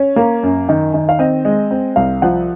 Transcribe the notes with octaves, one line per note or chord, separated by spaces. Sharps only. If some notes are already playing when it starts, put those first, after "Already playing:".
Already playing: C#4
A#3
F#2
D#3
D#3
F5
C4 D#5
G#3
C4
C2 F5
F3 F#5